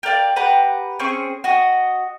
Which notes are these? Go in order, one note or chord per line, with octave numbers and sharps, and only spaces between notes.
G4 A#4 D5 F5
G4 B4 F#5 A#5
C4 C#4 G#4 C#6
F#4 D#5